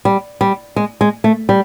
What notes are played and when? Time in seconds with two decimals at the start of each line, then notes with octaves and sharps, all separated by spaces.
0.05 G3
0.41 G3
0.76 G#3
1.01 G#3
1.24 A3
1.49 G3